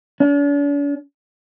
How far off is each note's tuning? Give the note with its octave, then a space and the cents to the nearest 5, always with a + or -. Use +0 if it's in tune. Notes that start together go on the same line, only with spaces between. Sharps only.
D4 -45